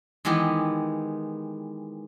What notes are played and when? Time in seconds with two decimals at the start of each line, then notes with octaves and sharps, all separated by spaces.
0.25 D#3 E3 G#3 B3 G4